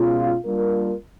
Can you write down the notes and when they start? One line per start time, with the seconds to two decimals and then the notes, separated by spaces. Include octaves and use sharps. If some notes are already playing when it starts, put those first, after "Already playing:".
Already playing: B2 G#3 C#4 F4
0.45 G3 A#3 D4 F4 A#4